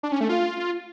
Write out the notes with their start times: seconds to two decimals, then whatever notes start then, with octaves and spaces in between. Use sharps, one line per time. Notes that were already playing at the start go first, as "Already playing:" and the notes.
0.03 D4
0.12 C#4
0.21 A3
0.29 F4